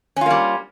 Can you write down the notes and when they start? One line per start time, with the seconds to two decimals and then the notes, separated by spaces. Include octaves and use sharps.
0.16 C#4
0.21 F4
0.26 A#3
0.30 G3